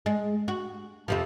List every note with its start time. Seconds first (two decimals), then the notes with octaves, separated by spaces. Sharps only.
0.06 G#3
0.48 F#4
1.08 F2 C3 F3